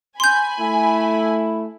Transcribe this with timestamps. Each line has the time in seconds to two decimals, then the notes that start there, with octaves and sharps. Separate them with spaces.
0.20 G#5 B5 C6 G6
0.60 A3 E4